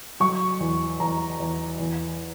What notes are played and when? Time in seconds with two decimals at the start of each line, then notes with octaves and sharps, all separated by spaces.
0.20 F#3 C#6
0.60 E2
1.00 E2 A#5
1.40 E2
1.79 E2